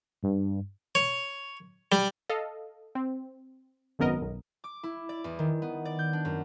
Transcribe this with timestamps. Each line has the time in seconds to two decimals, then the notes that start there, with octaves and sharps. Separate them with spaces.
0.23 G2
0.95 C#5
1.92 G3
2.29 A4 D#5 F5
2.95 C4
3.99 G#1 F#2 B3 A#4 D#5
4.22 B1
4.64 D6
4.83 E4
5.09 D5
5.24 E2
5.39 D#3
5.62 B3
5.85 D5
5.99 G6
6.13 D4
6.25 F#2